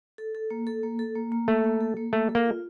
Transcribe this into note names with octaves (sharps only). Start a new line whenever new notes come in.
A4
A4
A#3
A4
A#3
A4
A#3
A#3
A3 A#3
A#3
A4
A#3
A3 A#3
A4
A#3
F4